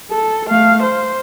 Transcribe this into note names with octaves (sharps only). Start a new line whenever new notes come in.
A4
A3 F5
C5